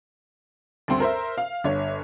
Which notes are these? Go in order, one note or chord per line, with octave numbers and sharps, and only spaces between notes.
D2 G2 C4 C6
A#4 C5 E5
F5
G1 C#5